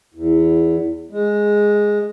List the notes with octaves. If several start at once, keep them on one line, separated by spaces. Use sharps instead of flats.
E2
G#3